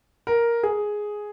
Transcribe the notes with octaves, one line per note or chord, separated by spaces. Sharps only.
A#4
G#4